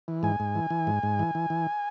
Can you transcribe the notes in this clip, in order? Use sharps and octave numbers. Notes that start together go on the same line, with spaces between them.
E3
G#2 G#5
G#2
E3
E3
G#2
G#2
E3
E3
E3